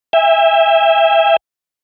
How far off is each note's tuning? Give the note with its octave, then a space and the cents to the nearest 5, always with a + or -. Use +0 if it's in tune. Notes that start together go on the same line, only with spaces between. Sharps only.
E5 +0 G#5 -45